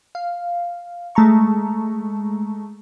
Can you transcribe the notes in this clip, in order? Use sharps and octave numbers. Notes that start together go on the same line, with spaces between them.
F5
G#3 A3 A5 A#5 C#6